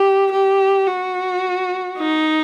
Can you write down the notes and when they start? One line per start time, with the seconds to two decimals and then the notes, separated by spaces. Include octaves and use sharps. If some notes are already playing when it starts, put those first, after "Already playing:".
Already playing: G4
0.32 G4
0.87 F#4
1.98 D#4